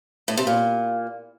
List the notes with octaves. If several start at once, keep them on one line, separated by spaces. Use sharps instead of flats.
A2
C3
A#2